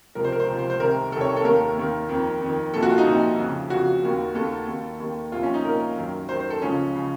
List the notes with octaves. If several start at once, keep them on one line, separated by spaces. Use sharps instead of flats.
C#2 C3 F3 A#4
C5
A#4
C5
C#2 C3 F3
C5
C5
C2 C3 D#3 A#4
C2 C3 D#3 A4
C#5
A4
D#2 D#3 A#4
D#2 D#3
F2 D#3
F2 D#3
C2 A#2 F3 A4
F#4
F4
D#4
C2 A#2 F3
F2 C#3 F3
F2 C#3 F3 F#4
D#2 D#3
D#2 D#3 A4
D#2 D#3
D#2 D#3
C2 A#2 F3 F4
C#4
D#4
C2 A#2 F3 A#4
F#2 D#3
F#2 D#3 C5
C5
A4
C#2 C#3 F3 C#4
C#3 F3